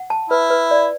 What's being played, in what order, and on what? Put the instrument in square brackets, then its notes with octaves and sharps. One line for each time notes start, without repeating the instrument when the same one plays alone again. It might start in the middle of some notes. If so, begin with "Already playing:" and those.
Already playing: [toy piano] F#5
A5
[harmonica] E4 [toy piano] B4
[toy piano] B4
D5